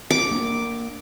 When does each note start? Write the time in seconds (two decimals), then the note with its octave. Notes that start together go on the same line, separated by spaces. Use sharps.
0.11 D6
0.31 A#3 D4